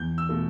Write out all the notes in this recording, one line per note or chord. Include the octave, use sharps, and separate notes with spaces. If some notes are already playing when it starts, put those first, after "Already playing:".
Already playing: E2 G6
E6
B2 A3